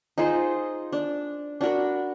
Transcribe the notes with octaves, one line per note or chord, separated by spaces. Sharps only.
D#4 F4 G#4 C5
D4
D4 F#4 A#4 B5